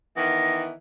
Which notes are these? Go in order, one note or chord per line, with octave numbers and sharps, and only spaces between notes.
D#3 E3 B3 A#6